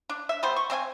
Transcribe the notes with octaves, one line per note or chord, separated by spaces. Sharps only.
D4
E5
G3 B3 C5
C#6
C4 C5 E5 G#5